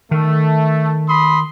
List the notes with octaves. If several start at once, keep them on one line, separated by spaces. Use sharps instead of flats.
D#3 A3
B5 C6 D#6